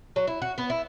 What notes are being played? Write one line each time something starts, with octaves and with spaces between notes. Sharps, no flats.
F#3
E4
F#4
B3
E4